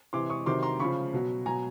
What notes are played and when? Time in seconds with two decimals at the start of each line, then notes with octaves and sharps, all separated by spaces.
0.13 C3 E3 C6 D6
0.30 C#6 D#6
0.46 C3 D#3 F#3 C6 D6
0.63 A#5 C6
0.80 C#3 F3 B5 C#6
1.13 B2 F#3
1.46 B2 F#3 G#5 A#5